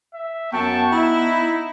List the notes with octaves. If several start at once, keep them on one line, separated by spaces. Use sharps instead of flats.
E5
F#2 B3 G5 A5 C#6
D#4 E4